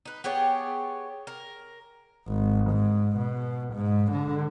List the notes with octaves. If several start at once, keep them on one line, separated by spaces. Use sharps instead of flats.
D#4 B4
B3 G4 G#4 C#5
A#4
G#1
G#2
B2
G#2
D3